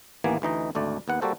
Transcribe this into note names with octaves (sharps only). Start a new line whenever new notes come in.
A1 D#2 E3 A#3 B3 G#5
D2 E3 D#4 D#5
G#1 D2 A3 D5
D#2 B3 F#5
G3 A#3 F#4 A4 C5